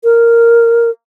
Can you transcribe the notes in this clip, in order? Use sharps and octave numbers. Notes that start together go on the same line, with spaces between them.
A#4